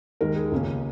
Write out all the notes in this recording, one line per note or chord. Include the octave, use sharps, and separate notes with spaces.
D#2 D#3 G#3 A#4
G#4
C#2 C#3 A#3 C#4